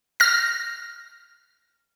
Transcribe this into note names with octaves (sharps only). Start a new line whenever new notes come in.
F6 A#6